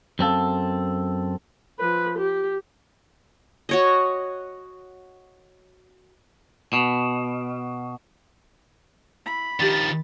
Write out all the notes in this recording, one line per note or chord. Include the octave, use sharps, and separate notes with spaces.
F#2 C4 A4 F5
F3 B4
G4
F#4 C#5 D#5
B2
E4 B5
D#3 F3 D4 G4 A6